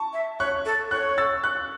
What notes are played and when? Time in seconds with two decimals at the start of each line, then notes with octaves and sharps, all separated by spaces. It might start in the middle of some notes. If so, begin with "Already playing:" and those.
Already playing: A5 C#6
0.13 E5
0.40 C#5 C#6 F#6
0.65 A4
0.91 C#5 C#6 F#6
1.18 E6 A6
1.44 C#6 F#6